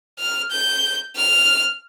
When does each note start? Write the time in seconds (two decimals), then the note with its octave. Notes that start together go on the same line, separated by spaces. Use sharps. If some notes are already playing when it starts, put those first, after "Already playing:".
0.19 F6
0.51 G6
1.17 F6